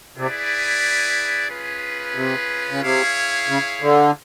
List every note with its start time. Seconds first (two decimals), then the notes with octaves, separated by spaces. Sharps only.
0.17 C3 E4 G#4 B4 D5
1.49 C#4 F4 G#4 B4
2.15 C3
2.70 C#3
2.82 C3 E4 G#4 C#5 F5
3.48 C#3
3.81 D3